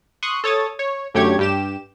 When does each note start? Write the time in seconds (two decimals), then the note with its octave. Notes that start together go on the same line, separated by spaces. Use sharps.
0.23 C6 C#6 D#6 F#6
0.44 A4 C#5 D#6 A6
0.79 C#5
1.14 F#2 D3 A3 G4 C#5 G#6
1.39 G2 G4 E7